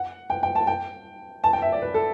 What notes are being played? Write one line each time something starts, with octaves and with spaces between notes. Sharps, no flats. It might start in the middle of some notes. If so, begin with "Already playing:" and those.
Already playing: F#5
G5
G5
A5
G5
A5
G5
E5
D5
B4
A4